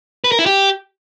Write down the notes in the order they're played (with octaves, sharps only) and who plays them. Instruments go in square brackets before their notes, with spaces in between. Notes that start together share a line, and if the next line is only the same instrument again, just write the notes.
[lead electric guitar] B4
A#4
E4
G4